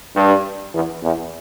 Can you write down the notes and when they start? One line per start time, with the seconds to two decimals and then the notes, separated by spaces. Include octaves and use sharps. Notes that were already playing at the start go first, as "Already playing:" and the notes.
0.16 G2
0.73 E2
1.03 E2